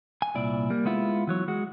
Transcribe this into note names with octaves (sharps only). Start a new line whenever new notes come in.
G#5
C2 A#2 E4 D5
G3 A#3
G#3 B3 E4 F4
E3 F#3 C#5
G#3 F#4